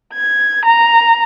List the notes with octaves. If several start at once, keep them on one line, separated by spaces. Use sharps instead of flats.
G#6
A#5